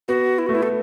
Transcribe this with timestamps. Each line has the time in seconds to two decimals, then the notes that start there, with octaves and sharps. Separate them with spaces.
0.08 B3 F#4
0.38 E4
0.47 A3 F#4
0.53 B3 E4
0.63 A4